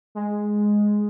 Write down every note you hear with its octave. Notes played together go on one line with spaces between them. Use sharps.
G#3